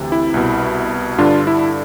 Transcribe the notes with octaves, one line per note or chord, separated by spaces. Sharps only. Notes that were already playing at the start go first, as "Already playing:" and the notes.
Already playing: D2 C3 E3
E4
C2 B2
G2 D3 D4 F4
E4